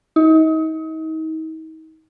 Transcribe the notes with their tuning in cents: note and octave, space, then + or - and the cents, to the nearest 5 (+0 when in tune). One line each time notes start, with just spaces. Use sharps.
D#4 +35